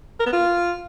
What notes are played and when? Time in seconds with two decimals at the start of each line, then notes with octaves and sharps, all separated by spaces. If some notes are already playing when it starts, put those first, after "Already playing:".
0.20 A#4
0.26 B3
0.33 F4